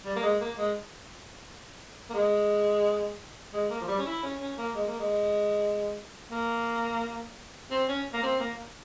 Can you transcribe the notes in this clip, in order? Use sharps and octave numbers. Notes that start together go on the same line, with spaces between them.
G3
A#3
G#3
A#3
G#3
A#3
G#3
G#3
A#3
F3
G3
C#4
E4
C#4
C#4
A#3
G#3
A#3
G#3
A#3
C4
C#4
A#3
C4
A#3